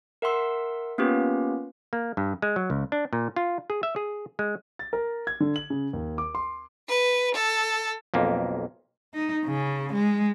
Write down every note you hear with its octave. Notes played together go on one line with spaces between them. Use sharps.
A#4 E5 F#5 C6 E6
A#3 B3 C#4 F4 G4 B4
A#3
G2
G#3
F#3
C#2
D4
A#2
F4
G#4
E5
G#4
G#3
A6
A#4
G#6
D3
F#7
C#3
D#2
D6
C6
B4
A4
B1 F2 A#3
D#4
C#3
G#3